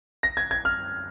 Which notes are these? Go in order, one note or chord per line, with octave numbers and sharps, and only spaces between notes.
A#6
G#6
G#6
F6